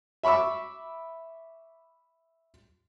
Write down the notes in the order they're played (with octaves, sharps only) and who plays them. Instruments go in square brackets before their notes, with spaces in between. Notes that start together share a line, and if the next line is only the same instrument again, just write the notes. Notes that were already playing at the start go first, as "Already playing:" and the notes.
[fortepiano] E5 B5 C#6 D6 E6